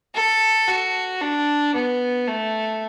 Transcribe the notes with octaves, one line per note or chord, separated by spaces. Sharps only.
A4
F#4
D4
B3
A3